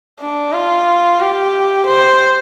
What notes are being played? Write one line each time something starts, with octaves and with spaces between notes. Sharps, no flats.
D4
F4
G4
C5